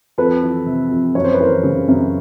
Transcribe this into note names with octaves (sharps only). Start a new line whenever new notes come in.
F2 A4 B4
E3
C3
F2
F#2 C#5
C5
B4
E3 A#4 C5
C#3
F#2